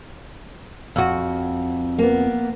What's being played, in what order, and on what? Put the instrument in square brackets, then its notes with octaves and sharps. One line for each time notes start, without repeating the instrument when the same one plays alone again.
[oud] F2 F#4
[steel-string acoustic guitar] A#3 B3